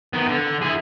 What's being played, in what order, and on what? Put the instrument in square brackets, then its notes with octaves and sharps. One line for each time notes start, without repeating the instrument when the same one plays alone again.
[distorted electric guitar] D#3 B3
D3
E4 G#4